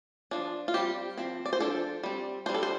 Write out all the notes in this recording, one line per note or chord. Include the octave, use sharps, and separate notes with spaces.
F3 D4
F4
G3 C4 G4
F3 C4
D5
C5
F3 D4 A4
G3 C4
G3 D4 C5
A4
C5